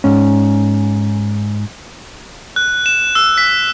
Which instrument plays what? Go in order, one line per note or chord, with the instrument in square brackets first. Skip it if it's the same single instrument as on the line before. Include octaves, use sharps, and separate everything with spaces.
[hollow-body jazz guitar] G#2 C#4
[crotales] F#6
E7
E6
B6